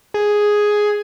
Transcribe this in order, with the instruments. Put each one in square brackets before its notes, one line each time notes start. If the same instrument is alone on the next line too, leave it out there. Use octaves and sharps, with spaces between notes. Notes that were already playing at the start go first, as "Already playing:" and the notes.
[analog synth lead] G#4